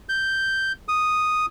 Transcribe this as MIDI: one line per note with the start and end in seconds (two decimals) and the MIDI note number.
0.09 0.72 91
0.88 1.46 87